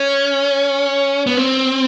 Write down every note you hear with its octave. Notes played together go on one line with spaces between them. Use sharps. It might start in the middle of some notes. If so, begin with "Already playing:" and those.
Already playing: C#4
B3
C4